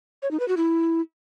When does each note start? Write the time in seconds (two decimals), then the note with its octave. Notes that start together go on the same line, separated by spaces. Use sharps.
0.22 C#5
0.31 D#4
0.40 B4
0.48 F#4
0.57 E4